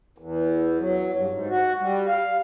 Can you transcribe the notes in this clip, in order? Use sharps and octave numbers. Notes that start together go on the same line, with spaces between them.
E2
F#3
G2
G#2
F#4
G3
F5